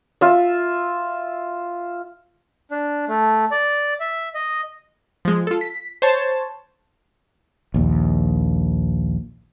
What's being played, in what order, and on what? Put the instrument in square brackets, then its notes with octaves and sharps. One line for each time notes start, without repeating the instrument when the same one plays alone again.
[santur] F4 E5
[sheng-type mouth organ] D4
A3
D5
E5
D#5
[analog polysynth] F3 G#3
F4 A4
B6
C5 C#5 A5
[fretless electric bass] A#1 D#2